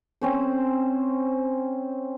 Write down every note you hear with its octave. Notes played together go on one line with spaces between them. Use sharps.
C4 C#4 C5